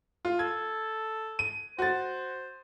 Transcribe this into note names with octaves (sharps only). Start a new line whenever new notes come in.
F4
A4 G#6
D#7
F#4 C5 A6